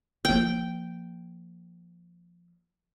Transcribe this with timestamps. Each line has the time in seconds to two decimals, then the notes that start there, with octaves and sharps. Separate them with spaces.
0.25 F3 A#3 G5